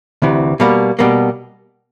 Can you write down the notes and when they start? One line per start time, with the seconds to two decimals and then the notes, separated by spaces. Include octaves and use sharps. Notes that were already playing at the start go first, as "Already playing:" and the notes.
0.22 D2 C3 E3
0.60 B2 G3 A#3
0.99 B2 G3 A#3